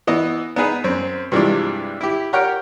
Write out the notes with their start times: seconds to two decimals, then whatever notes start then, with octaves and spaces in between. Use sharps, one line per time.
0.07 E3 B3 D#5
0.56 B3 D#4 G#4 B4
0.84 F#2 C4
1.32 G2 C3 E3 F3 G#3 D4
2.01 E4 G4
2.33 G4 A#4 C#5 F#5 G5